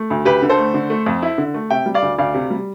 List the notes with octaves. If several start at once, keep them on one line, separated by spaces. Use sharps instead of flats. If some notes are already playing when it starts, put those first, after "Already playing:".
Already playing: A3
D2
D2 G4 B4
D3
A4 C5
A3
D3
A3
F2
E4
D3
A3
C3 E5 G5
G3
D5 F5
D2
D2 D5 F5
C3
G3